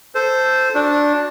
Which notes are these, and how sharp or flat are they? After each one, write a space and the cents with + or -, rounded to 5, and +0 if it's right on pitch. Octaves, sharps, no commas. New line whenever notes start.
A4 +0 C5 -10
D4 -5 F#4 -30